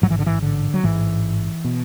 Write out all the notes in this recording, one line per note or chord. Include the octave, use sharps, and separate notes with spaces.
A1 G#2 F#3
E3
D3
E3
D3
F#3
A1 G#2 E3
B2